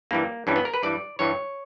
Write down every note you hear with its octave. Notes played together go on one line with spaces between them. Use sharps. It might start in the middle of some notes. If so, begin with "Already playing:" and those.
G2 E3 G3 A#3
G2 E3 G3 C#4
B3
A#4
B4
G2 E3 G3 D5
G2 E3 G3 C#5